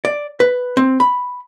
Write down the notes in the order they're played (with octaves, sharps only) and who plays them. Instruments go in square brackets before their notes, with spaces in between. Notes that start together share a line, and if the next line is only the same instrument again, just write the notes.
[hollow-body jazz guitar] D5
B4
C4
B5